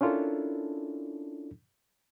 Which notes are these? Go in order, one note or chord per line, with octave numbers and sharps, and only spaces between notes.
C#4 D4 E4 F4 A4 A#4